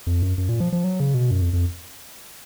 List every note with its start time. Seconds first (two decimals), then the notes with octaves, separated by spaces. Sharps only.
0.07 F2
0.22 F#2
0.38 F#2
0.49 A#2
0.60 F3
0.73 F3
0.84 F#3
1.00 C#3
1.14 B2
1.31 F#2
1.42 F2
1.53 F2